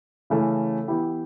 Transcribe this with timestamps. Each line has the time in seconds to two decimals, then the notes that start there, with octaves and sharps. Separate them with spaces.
0.30 C#3 E3 A3 C#4
0.88 E3 B3 E4 G4